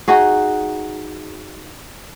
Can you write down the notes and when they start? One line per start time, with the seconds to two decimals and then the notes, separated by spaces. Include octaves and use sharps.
0.08 D#4 F#4 G#4